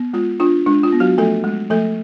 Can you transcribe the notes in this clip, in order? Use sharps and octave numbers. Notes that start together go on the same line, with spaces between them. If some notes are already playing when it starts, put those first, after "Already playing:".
Already playing: B3
G#3 F4
D4 F4
G#3 D4
F4
B3
F#3 F#4
F3 A3 A4
G#3
F3 A3 A4